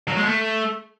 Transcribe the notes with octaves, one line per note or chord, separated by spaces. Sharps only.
F#3
G#3
A3